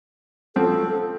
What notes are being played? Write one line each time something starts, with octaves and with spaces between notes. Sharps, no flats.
F3 C4 F#4 A4